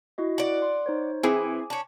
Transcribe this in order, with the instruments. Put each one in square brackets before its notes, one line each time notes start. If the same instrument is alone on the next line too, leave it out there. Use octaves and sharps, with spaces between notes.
[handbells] E4 F#4 D#5
[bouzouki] D5 F#5
[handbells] C6
D#4 C5 C#5
[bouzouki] E3 [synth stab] C4 E4 G#4 [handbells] G#5 D6
[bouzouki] C#4 D4